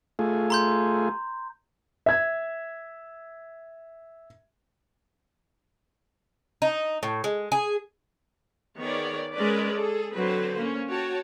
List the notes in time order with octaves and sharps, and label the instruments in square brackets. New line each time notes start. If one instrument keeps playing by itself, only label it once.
[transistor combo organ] A3 F4 G#4
[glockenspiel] A#5 C6 G6
[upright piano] E5 G#6
[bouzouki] D#4
A2
G#3
G#4
[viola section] D#3 B3 G#4 A#4 C#5 D5
G#3 C#4 A#4 B4 D5
G#4 A4
D3 F#3 C4 B4 C5
A#3 C#4
F#4 C#5 G5 A5